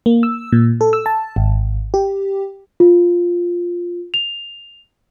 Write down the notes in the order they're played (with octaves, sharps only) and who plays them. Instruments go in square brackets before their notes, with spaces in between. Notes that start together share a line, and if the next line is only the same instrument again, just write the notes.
[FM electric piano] A#3
E6
A#2
A4
E6
A5
G#1
G4
[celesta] F4
F7